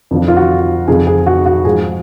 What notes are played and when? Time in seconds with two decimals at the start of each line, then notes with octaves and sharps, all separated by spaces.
0.11 F2 D3 F3
0.28 F4
0.36 F#4
0.88 F2 C#3 F3 G#4
1.07 G#4
1.26 F#4
1.46 F#4
1.65 G#2 F3 G#4